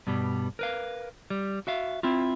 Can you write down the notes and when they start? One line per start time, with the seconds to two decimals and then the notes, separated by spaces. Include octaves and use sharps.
0.07 G2 B2 G3
0.59 A#4 B4 F5
1.30 G3
1.67 F#4 E5 F5
2.03 C4 E4 F4